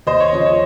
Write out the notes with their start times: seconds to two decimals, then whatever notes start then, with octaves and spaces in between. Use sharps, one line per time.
0.07 D#2 C5 D#5
0.20 C#5
0.33 C#3 F3 D#5
0.46 C#5